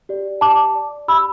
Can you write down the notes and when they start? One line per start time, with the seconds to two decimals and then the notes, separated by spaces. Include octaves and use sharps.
0.09 G4 D5
0.41 G4 A5 D6
0.75 D5
1.08 G4 B5 E6